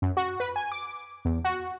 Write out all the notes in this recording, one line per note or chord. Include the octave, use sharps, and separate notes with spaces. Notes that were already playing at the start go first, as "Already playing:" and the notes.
F#2
F#4
B4
G#5
D6
E2
F#4